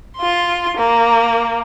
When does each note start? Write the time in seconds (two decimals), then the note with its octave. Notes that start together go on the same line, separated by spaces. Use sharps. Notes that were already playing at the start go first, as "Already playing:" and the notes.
0.17 F4 C6
0.77 A#3